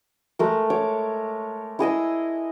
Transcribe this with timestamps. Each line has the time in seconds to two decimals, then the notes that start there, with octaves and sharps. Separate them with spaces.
0.39 G#3 A3 A#4
0.70 C#5 D6
1.79 E4 G#4 D#5 E6